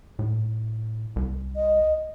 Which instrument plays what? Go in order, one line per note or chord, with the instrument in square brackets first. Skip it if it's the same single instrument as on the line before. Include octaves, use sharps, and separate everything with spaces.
[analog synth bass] A2
C2
[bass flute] D#5